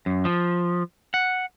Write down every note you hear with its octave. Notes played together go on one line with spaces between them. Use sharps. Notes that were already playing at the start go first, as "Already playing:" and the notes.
F#2
F3
F#5